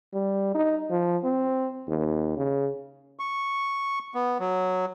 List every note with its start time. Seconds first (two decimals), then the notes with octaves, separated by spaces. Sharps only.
0.14 G3
0.55 D#4
0.90 F3
1.24 C4
1.88 D#2
2.37 C#3
3.19 C#6
4.15 B3
4.40 F#3